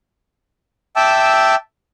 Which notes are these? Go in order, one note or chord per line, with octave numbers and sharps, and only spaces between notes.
E5 G5 A5 D6 E6